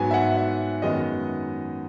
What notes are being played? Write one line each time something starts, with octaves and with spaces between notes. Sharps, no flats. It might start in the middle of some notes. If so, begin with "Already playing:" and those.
Already playing: G#2 F#3 B3 G#5
E5
F#5
E5
F#2 D#3 G#3 B3 D#5